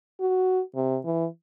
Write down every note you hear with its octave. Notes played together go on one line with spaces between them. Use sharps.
F#4
C3
E3